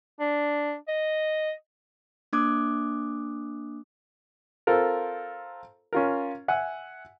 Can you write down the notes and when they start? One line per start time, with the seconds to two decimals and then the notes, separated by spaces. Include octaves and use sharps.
0.20 D4
0.88 D#5
2.33 A#3 D4 D6 D#6 F#6
4.67 C4 F4 A4 A#4
5.93 C#4 F4 A#4
6.48 E5 F#5 G#5